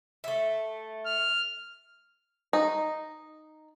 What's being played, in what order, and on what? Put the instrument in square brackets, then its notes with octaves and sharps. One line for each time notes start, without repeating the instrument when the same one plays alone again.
[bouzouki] A3 E5
[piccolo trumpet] F6
[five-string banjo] D#4